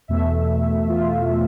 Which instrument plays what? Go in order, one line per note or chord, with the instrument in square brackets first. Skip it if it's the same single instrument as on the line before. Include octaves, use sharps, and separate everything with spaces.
[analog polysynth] E2 B2 A3 E5
F4